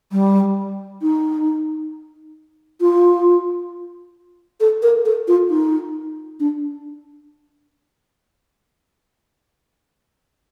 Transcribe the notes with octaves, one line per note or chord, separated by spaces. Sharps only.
G3
D#4
F4
A4
A#4
A4
F4
D#4
D4